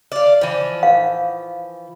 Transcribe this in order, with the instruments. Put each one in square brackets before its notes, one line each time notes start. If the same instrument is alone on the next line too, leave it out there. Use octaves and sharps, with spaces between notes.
[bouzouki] D5 F5
E3 F3
[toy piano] F5